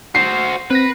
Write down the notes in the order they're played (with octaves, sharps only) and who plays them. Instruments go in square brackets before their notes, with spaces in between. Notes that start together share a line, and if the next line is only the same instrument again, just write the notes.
[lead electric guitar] F#4 C5 [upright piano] C7
[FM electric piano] C4 F#6 A#6 [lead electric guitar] B4